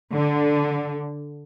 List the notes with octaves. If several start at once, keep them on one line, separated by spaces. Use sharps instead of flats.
D3